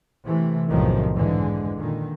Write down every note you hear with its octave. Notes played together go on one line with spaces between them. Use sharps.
C3 E3 A3
B1 F#2 A2 C3 D#3 F3
F2 G#2 D3 E3 G#3
A#2 D3 D#3